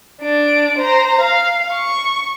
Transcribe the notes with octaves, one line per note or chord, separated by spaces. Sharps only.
D4 D7
C5 A#5
F5
C#6